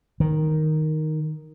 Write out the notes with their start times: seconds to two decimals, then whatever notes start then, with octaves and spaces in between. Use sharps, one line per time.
0.20 D#3